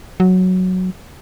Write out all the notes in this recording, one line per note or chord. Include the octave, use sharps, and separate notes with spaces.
F#3